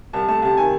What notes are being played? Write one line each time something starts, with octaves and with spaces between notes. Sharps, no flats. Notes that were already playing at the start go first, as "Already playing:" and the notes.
C2 A5
A3 A5
C3 A5
D#3 G#5